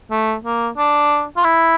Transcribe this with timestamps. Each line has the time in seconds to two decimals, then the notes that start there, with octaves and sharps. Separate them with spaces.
0.11 A3
0.45 A#3
0.78 D4
1.37 F4
1.44 E4